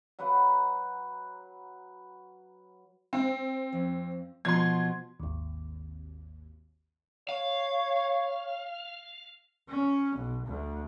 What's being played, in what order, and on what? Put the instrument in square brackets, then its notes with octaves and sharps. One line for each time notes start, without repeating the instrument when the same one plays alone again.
[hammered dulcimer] F#3 B4 F#5 B5
[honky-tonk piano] C4
[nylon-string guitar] F2
[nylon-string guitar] B2 F3 [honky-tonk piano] C6 G#6
[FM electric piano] G#1 D#2
[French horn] C#5 [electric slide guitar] F5
[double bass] C#4
B1
D2